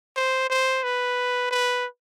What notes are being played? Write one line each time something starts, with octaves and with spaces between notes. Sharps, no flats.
C5
C5
B4
B4